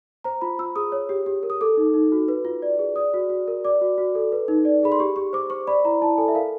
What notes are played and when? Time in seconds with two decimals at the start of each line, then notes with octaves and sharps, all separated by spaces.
0.24 C5 A#5
0.41 F4 B5
0.59 F4 E6
0.76 G#4 D#6
0.92 C#5
1.09 G4
1.26 G4
1.43 A#4
1.50 D#6
1.61 A4 D6
1.77 D#4
1.94 D#4
2.12 F#4
2.28 B4
2.45 F4
2.62 D5
2.79 G#4
2.96 D5 D#6
3.14 F#4
3.29 F#4
3.48 A#4
3.65 D5 D6
3.81 F#4
3.98 F#4
4.15 A4
4.32 B4
4.48 D#4
4.65 D5
4.83 G#4 B5
4.92 C6
5.00 G4 C#6
5.16 G4 C#6
5.33 C5 D6
5.50 C5 C#6
5.67 D5 B5
5.85 E4 A#5
6.02 E4 A5
6.18 A4 G#5
6.28 E5
6.35 A#4 F5